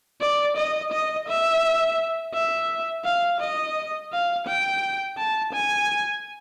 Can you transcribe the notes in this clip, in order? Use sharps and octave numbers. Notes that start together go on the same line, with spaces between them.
D5
D#5
D#5
E5
E5
F5
D#5
F5
G5
A5
G#5